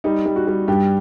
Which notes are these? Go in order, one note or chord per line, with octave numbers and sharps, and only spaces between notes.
G3 D#4
G3
F#4
G3
G2 G4